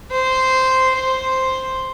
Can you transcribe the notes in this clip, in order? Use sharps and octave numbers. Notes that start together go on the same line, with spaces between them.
C5
C5